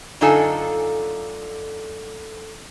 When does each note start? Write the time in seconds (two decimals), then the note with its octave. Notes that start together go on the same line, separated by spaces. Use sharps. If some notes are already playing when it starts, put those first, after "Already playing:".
0.21 F#2 D3 D#4 F4 A4 G#5